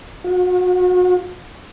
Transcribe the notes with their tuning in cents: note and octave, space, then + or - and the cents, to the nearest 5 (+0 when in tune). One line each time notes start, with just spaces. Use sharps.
F#4 -35